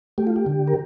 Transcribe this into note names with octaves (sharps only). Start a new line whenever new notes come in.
A3 G4
F4
G4
D3
A#4